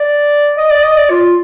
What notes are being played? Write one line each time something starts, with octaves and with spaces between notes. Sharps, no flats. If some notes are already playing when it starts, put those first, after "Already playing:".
Already playing: D5
D#5
D5
D#5
D5
F4